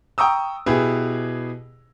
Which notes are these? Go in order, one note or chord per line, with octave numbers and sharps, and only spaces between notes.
G5 A#5 C#6 D#6 E6
B2 E4 G4 G#4 B4